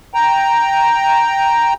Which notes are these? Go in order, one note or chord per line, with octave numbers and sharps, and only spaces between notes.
G5 A#5